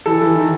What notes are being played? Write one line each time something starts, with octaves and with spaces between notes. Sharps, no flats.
E3 A4
E3
D#3